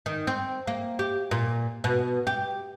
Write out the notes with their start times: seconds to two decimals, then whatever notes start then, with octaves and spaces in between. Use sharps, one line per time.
0.06 D#3
0.27 C4
0.67 A#3
0.99 G4
1.31 A#2
1.84 B2
2.27 G4